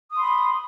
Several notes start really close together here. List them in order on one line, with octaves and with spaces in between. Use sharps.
D#6 C6 B5